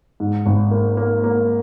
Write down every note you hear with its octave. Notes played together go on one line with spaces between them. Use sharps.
G#2
G#1
A#3
A#3
A#3